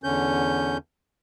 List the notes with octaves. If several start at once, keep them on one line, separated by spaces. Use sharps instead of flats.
E2 D3 C#4 G6